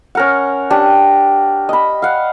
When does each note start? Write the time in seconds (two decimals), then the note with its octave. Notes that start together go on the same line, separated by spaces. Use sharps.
0.15 C#4 A#4 F#5
0.70 D4 G4
1.69 D#5 B5
2.02 F5 F#5